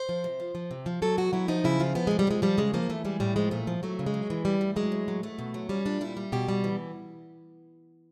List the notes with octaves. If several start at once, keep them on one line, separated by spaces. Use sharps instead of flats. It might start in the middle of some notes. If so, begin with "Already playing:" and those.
Already playing: C5
F3
C3
F3
F3
C3
F3
F#3 A4
B2 F#4
F#3 E4
F3 D#4
C#3 E4
F3 F4
F3 B3
C3 G#3
G3
F3 G#3
F3 G3
C#3 G#3
F3 A#3
E3 A3
G3 G#3
A2 G3
F3 G#3
A#2 A3
F3
F#3 A3
C#3
G#3
F#3
E3
G3
A2
F#3 G#3
A2
F#3
F#3 A3
B2
F#3
G3 C#4
A#2 D4
G3 E4
G3
B2 G4
G3
E3